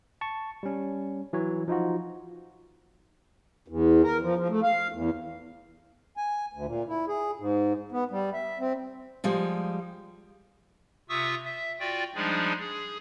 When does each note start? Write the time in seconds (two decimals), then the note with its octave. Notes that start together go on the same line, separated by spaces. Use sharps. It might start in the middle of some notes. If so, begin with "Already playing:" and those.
0.21 A5 C#6
0.63 G3 C#4
1.33 E3 F#3 C#5
1.68 F3 D#4 F4 F#4
3.68 E2
4.03 A#4
4.21 F3
4.37 F3
4.49 A3
4.63 F5
4.92 E2
6.17 G#5
6.53 D2
6.66 A#2
6.89 E4
7.08 G#4
7.39 G#2
7.92 B3
8.11 G3
8.34 E5
8.60 C4
9.24 F3 G3 G#3
11.09 C3 F4 E5 C#6 D#6 E6
11.44 E5
11.80 F4 F#4 D5 G5
12.15 F3 G3 G#3 D4 D#4 G#4
12.59 G#4